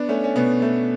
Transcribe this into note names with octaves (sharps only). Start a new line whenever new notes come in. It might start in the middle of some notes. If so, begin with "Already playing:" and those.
Already playing: B3 D4
A3 C#4
C#4
B2 B3
A3